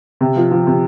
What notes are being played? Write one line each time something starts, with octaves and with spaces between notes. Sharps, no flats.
C3
F3
F3
C3